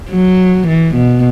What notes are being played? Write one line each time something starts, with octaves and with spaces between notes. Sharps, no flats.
F#3
E3
B2